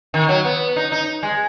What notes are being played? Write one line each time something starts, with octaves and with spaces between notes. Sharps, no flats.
D#3
F#3
B3
D#4
D#4
G#3